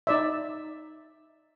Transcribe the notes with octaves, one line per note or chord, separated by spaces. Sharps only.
D#4 D5 E5